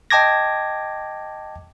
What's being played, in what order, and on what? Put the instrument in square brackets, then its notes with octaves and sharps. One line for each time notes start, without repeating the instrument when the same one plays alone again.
[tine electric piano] D#5 G5 A5 D6 G#6 A#6